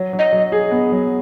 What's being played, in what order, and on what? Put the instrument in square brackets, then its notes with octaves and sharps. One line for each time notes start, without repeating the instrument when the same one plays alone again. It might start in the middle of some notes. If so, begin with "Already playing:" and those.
Already playing: [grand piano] F#3
F#3
[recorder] D#5
[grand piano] F#3
G#4
B3
F#3